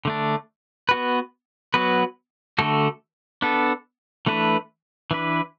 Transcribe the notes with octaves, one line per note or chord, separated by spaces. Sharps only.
D3 A3 D4
B3 F#4 B4
F#3 B3 F#4 B4
D3 A3 F#4 A4
B3 D4 A4
E3 A3 D4 B4
E3 D4 B4